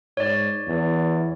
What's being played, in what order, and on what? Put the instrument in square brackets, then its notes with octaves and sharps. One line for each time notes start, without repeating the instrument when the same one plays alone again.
[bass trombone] G#2 [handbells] C#5 D5
[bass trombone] E2